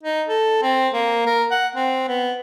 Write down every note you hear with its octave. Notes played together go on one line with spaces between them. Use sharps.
D#4
A4
C4
A#3
A#4
F#5
C4
B3